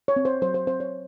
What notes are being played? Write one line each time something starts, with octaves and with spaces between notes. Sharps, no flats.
C#5
C4
C5
F#3 C5
C5
C4 C5
C#5